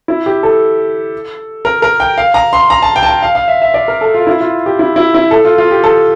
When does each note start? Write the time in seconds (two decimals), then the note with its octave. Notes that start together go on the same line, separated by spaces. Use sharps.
0.08 E4
0.26 G4
0.43 A4
1.65 A#4
1.82 A#4
2.00 G5
2.18 F5
2.34 A#5
2.53 C6
2.70 A#5
2.82 A5
2.96 G5
3.03 A5
3.09 G5
3.23 F5
3.35 F5
3.48 E5
3.62 E5
3.74 D5
3.88 A#4
4.01 A4
4.14 F4
4.27 E4
4.40 F4
4.66 G4
4.79 E4
4.96 E4
5.15 E4
5.31 A4
5.45 F4
5.58 F4
5.71 G4
5.84 A4